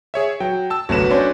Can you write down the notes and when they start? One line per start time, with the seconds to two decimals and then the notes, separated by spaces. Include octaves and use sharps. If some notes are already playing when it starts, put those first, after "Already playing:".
0.14 G#4 C#5 E5
0.40 F#3 G5
0.70 A5 E6
0.89 G1 C2 F#3 A3 B4 E7
1.10 C#4 D4 C5